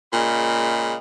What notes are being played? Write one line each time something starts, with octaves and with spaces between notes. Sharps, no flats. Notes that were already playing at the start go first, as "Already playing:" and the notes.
A#2 C#3 G#3 B5